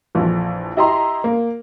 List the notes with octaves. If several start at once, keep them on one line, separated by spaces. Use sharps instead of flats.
A#1 F2 E3
E4 G4 D#5 E5 A#5 C6
A#3